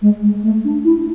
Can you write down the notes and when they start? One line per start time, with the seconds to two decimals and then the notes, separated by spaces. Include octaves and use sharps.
0.02 G#3
0.23 G#3
0.43 A3
0.65 D4
0.85 E4